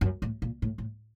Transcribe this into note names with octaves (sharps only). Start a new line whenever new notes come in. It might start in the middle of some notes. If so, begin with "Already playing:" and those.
F#2
A2
A#2
A2
A2